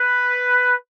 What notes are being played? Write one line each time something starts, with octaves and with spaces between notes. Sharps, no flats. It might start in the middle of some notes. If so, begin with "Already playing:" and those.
Already playing: B4